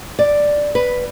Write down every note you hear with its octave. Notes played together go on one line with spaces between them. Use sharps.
D5
B4